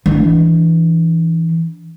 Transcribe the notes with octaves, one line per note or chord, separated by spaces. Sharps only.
E3 D4